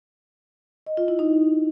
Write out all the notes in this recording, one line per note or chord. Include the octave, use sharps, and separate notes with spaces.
D#5
F4
E4
D#4